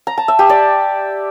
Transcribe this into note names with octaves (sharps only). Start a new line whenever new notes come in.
A#5
A5
E5
G4
D5